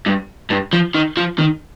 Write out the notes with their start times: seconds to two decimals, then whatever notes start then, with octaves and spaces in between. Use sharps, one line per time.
0.06 G2
0.50 G2
0.73 F3
0.95 D#3
1.17 F3
1.39 D#3